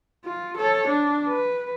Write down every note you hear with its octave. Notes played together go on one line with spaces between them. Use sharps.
F4
A4 C#5
D4
B4